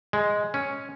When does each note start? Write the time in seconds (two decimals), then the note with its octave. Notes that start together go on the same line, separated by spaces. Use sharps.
0.13 G#3
0.54 C#4